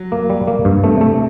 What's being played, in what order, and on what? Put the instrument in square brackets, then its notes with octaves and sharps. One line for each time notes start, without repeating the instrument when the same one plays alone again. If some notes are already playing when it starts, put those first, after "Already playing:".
Already playing: [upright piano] F#3
[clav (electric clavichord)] A#3
G3
A#3
G2
[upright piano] C3 [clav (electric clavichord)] A3
[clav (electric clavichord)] A3